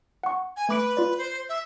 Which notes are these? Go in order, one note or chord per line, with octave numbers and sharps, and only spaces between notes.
F#5 C#6
G#5
A3 B4 D6 D7
F4 D5
C5
E5